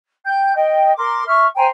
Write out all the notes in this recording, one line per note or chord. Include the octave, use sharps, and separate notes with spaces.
G5 G6
D#5 G5
A#4 C6 D6
E5 C#6 F6
C5 G5 G#5 A#5